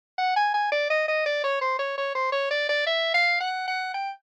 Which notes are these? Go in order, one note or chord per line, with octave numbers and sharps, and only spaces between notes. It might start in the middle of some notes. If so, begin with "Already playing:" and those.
F#5
G#5
G#5
D5
D#5
D#5
D5
C#5
C5
C#5
C#5
C5
C#5
D5
D5
E5
F5
F#5
F#5
G5